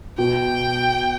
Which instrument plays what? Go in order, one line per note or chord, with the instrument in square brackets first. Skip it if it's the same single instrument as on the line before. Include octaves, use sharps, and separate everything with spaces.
[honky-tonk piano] B2 [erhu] G5